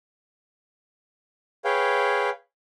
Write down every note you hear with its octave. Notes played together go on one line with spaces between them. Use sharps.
G#4 B4 C#5 F5 G5